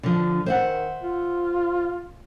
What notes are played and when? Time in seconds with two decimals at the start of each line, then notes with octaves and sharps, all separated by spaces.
0.03 D3 F3 D4
0.46 D#3 C5 E5 F#5
1.03 F4